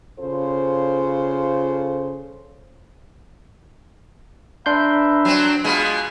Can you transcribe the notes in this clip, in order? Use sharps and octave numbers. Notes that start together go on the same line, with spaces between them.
C#3 F4 A4 C5
D4 B4 E5 A#5 C6 G6
F#3 C4
B2 G#3 F4 G#5 B5